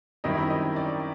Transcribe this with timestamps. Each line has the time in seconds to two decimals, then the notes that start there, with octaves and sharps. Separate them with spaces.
0.24 F#2 D#3 G3 C4 E4 D#5
0.50 D#5
0.76 D5